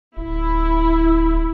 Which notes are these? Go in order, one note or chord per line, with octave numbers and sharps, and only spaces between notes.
D1 E4